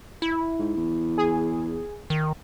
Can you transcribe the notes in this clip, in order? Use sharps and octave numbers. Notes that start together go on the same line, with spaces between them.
E4
G#2
E2
G#4
D#3